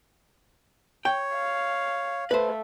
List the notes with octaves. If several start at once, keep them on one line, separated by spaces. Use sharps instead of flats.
C#5 G5
F5
A3 B4 C5